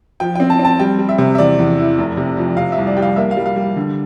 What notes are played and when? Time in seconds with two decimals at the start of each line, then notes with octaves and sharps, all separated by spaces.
0.20 F3 G5
0.35 C4 G5
0.50 A5
0.59 C4
0.65 A5
0.79 G3 G5
0.99 G3
1.09 E5
1.18 C3
1.35 E5
1.38 E2 D5
1.59 E2
1.78 E4
1.98 F1
2.17 C3
2.37 F2
2.57 C3 F5
2.72 E5
2.77 C2
2.87 D5
2.97 G3 G5
3.02 F5
3.16 A#3 E5
3.31 F5
3.37 G3
3.46 F5
3.56 G3
3.76 D3